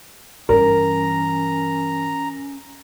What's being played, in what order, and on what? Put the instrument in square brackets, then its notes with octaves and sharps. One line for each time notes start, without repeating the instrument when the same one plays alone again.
[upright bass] G2 E3 [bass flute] C#4 [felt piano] A#4 [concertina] A#5